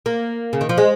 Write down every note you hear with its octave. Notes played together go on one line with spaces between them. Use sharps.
A#3
C#3
D#3
F3
G#3